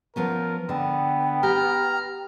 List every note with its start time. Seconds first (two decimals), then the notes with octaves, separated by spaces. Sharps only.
0.16 F3 B3 C#4 A#4
0.69 D3 B3 G5
1.43 G4 A#5 F6